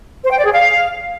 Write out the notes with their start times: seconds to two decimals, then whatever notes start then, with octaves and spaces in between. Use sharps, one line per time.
0.24 C5
0.31 G5
0.38 D5
0.45 G#4
0.52 F5